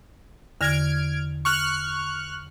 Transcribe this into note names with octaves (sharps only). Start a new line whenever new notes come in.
E2 D3 F6 G#6 A#6 D7
C#6 F6 F#6